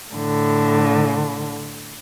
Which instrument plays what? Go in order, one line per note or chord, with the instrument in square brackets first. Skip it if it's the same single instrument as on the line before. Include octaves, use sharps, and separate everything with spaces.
[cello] A2 D3